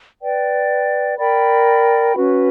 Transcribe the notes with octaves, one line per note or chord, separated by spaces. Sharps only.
B4 D5 G5
A#4 D5 G5 B5
C#4 F#4 B4